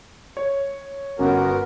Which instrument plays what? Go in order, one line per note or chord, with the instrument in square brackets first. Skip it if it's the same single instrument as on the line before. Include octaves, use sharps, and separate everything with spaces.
[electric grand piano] C#5
[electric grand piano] G1 C#4 [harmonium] B3 F#4 A#4